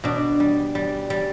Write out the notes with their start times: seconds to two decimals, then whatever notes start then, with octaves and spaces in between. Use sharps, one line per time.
0.04 B2 D4
0.40 G3
0.75 G3
1.10 G3